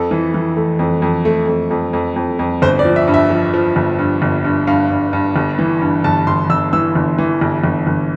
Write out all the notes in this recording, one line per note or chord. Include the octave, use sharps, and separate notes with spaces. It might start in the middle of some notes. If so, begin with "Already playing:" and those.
Already playing: F2 A4
E3
E3
A3
F2
F2
A3
F2
F2
F2
F2
F2
G1 C5
D5
F3
E5
G2
E5
F3
F3
G1
G2
G1
G2
G2 F5
G2
G2
G1
E3
G2
G1 A5
G1 C6
G1 E6
E3 E6
G1
E3
G1
G1
G1